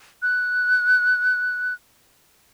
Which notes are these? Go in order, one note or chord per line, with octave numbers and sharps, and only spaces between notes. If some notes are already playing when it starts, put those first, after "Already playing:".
F#6